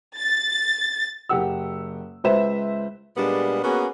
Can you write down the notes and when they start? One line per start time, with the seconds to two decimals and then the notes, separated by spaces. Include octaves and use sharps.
0.18 A6
1.29 F#1 G4 F#5 E6
2.24 C#2 B4 C5 E5 E7
3.17 A#2 G3 G#3 B3 D4 G#4
3.64 A#3 B3 C#4 F#4 G#4